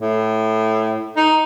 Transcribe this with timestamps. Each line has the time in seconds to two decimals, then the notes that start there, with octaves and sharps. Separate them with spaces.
0.01 A2
1.17 D#4